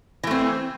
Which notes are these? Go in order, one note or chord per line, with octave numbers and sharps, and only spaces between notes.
E3 A3 C4